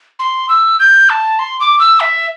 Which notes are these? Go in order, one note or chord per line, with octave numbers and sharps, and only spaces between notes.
C6
E6
G6
A5
C6
D6
E6
E5